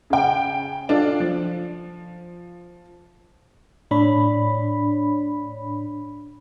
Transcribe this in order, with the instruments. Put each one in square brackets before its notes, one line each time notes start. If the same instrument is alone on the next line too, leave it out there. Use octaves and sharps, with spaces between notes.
[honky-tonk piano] C#3 G5
D4 F4 A4 D5
F3
[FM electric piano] A2 D4 C#5 B5